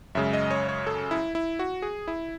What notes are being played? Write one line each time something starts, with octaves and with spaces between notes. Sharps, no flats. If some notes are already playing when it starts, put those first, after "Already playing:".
F#2 C#3 G#3 E5
D#5
C#5
C#5
A4
E4
E4
F#4
G#4
E4